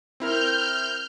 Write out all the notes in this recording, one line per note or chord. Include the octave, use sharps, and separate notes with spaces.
C4 E4 A#4 F6 G6